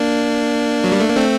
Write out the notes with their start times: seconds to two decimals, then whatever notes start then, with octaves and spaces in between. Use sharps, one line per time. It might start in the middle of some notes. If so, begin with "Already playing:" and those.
Already playing: A#3 D4
0.84 F#3
0.92 G3
1.00 A3
1.08 A#3
1.17 A3 C4